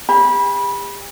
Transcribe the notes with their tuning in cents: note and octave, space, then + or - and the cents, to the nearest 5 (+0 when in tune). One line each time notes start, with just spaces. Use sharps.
G4 +45 B5 -20